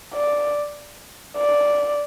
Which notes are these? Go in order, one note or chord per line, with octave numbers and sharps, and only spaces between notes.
D5
D5